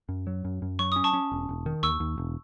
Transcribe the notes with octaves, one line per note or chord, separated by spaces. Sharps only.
F#2
F#3
F#2
F#2
F#3 C#6
C#4 D#6
A5 C#6
C#4
E1
E1
D#3
D#2 C#6 E6
D#2
E1